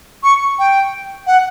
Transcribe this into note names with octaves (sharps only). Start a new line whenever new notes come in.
C#6
G5
F#5